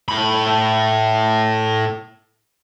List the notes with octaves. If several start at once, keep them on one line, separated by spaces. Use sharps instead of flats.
A2 B5